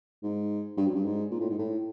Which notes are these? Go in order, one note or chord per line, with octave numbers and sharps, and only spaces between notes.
G#2
G2
F#2
G2
G#2
A#2
A2
G#2
A2